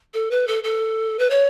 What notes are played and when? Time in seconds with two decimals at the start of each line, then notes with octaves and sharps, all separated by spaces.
0.14 A4
0.31 B4
0.47 A4
0.64 A4
1.19 B4
1.30 C#5